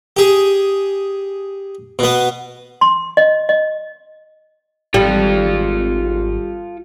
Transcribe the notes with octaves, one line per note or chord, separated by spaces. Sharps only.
G4 G#4
B2 B3
C6
D#5
D#5
G#1 G3 F4 A4